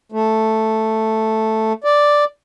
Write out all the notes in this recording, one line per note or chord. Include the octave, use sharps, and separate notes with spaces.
A3
D5